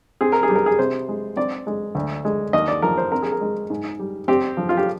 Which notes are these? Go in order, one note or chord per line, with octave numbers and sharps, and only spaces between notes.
C4 G#4
A#4
G#4
G3
A#4
G#4
C3 C5
G#3
C4 D5
G#3
D2
G#3
D#2 D#5
D5
F3 A#4
C5
C4 A#4
G#4
A#4
G#3
G#2
G3
C4 G4
F3
F4
G4